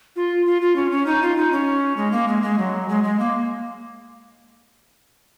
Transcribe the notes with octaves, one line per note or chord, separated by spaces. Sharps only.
F4
F4
F4
C#4
C#4
D#4
F4
D#4
C#4
G#3
A#3
G#3
G#3
F#3
G#3
G#3
A#3